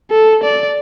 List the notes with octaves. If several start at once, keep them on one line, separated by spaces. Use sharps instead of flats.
A4
D5